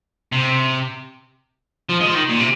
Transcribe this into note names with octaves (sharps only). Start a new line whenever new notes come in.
C3
F3
G#3
F3
D#3
A#2
C3